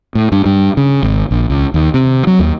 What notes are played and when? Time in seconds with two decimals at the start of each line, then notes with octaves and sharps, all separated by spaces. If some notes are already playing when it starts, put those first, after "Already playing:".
0.15 A2
0.32 G2
0.46 G2
0.77 C#3
1.03 G#1
1.31 A#1
1.50 C#2
1.74 D#2
1.94 C3
2.27 F#3
2.39 D#2